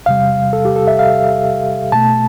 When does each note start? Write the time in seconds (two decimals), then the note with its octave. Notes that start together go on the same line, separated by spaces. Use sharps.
0.06 E2 C3 G3 F5
0.53 A4
0.65 G4
0.76 A4
0.87 E5
0.99 F5
1.92 B2 A3 A5